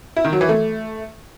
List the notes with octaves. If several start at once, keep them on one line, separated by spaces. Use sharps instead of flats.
E4
D#3
F#3
E3
A3